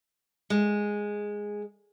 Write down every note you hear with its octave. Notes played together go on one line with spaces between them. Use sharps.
G#3